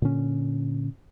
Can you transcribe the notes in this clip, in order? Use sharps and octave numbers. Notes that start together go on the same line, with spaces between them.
A#2 D3 C#4